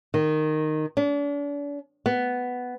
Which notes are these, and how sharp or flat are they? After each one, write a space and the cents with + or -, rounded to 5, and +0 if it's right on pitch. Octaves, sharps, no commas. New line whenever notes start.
D#3 -10
D4 -40
B3 +5